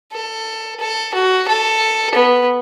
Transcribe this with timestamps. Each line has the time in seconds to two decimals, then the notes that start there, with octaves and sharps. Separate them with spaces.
0.13 A4
0.80 A4
1.14 F#4
1.48 A4
2.15 B3